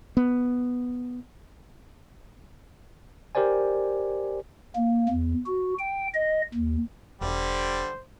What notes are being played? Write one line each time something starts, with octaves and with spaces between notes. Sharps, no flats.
B3
G4 A#4 C5 D5 G#5
A#3
E2
F#4
G5
D#5
D#2
E1 D3 G3 C5